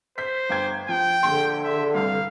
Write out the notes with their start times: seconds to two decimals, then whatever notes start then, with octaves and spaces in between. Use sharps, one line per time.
0.18 C5 G6 B6
0.49 G1 G5 G#6
0.89 F3 G5
1.23 A#1 D3 C6
1.64 E5
1.95 C2 G2 F5